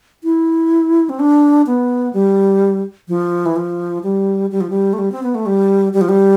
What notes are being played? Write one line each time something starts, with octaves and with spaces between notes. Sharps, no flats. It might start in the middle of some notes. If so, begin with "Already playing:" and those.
E4
C4
D4
B3
G3
F3
E3
F3
G3
G3
F3
G3
A3
G3
C4
B3
A3
G3
G3
F3
G3